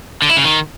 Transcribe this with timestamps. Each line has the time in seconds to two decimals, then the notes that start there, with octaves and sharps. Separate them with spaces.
0.22 D3
0.29 E4
0.37 C#3
0.44 D#3